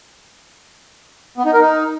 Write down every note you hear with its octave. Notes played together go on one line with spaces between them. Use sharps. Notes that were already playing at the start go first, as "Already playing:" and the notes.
B3
D#4
A#4
D#4